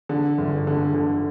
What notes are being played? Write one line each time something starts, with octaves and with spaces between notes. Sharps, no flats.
D3
G1
D3
D3